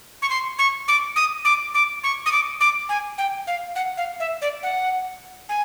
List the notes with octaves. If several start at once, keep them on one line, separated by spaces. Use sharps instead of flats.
C#6
C6
C#6
D6
D#6
D6
D6
C#6
D#6
D6
D6
G#5
G5
F5
F#5
F5
E5
D5
F#5
G#5